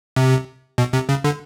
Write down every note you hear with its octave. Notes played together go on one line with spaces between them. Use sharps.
C3
B2
C3
C#3
D3